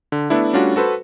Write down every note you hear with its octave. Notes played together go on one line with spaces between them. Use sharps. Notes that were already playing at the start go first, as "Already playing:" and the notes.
D3
A3 B3 D4 E4
G3 A3 C#4 D4 F4 F#4
F#4 A4 B4 C5